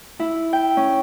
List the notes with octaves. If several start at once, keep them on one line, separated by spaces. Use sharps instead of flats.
E4
G5
C#4